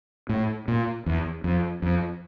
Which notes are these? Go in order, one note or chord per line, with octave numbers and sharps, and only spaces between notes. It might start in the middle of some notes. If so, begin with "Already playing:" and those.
A2
A#2
E2
F2
F2